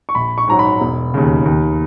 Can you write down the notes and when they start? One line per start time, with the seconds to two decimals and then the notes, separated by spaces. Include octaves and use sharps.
0.09 C#6
0.15 A#1 B5
0.38 C#6
0.48 G#2 F#3 A#5
0.59 B5
0.81 E1
1.14 D#2 C#3
1.46 D#2